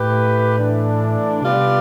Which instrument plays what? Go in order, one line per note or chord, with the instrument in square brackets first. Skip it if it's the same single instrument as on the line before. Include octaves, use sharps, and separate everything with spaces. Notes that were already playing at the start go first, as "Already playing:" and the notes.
Already playing: [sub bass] A2 [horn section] A3 E4 G4 B4
[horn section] E3 A3 D4
[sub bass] C3 [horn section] G3 B3 F4 B4 D5